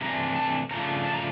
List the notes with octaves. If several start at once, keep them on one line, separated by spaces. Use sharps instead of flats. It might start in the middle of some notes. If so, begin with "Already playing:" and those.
C3 E3 A3 D4 A#5
A5
C#3 F3 A3 D4 A#5
A5
A#5